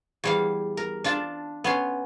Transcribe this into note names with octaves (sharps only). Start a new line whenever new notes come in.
E2 G3 F5
A#4
D4 F4 D5 A5
B3 C#4 C6